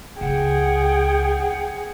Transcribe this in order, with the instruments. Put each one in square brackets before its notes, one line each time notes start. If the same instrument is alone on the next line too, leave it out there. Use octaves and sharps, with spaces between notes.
[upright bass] C#2 [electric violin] G#4 [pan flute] F#5 [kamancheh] G5